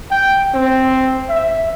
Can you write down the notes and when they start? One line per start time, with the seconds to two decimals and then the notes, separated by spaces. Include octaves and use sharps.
0.11 G5
0.53 C4
1.29 E5